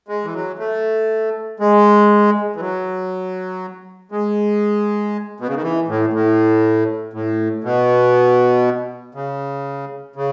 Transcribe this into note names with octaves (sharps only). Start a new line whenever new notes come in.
G#3
E3
F#3
A3
G#3
E3
F#3
G#3
B2
C#3
D#3
E3
A2
A2
A2
B2
C#3
C#3